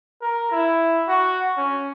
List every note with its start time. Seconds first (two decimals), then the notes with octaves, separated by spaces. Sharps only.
0.22 A#4
0.51 E4
1.08 F#4
1.57 C#4